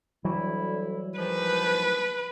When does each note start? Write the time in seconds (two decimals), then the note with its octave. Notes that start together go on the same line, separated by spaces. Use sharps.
0.25 D2 E3 F#3 G3 E4
1.18 G#2 D#3 F3 B4